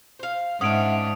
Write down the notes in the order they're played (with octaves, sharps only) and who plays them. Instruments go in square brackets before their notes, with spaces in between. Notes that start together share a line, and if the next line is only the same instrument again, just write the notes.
[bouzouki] C5 F5
[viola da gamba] G#2 [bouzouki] C#4 D4 [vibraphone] E5 F#5 [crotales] D#6 D7